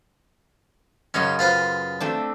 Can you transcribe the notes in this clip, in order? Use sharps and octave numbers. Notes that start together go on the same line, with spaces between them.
F#2 C#3 C#4 D#4
F4 B4 C5
A3 C4 D4